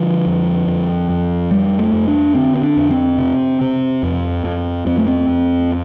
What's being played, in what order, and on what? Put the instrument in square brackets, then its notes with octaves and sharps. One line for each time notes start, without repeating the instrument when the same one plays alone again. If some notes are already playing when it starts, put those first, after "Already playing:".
Already playing: [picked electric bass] D3 F3
F2
F2
F2
F2 G3
A3
F2
D4
D3 C4
C4
D4
F2
C4
C3
C3
F2
F2
F2 C4
A3
C4
F2